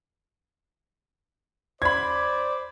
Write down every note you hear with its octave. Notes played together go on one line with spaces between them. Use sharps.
C5 D5 B5 G#6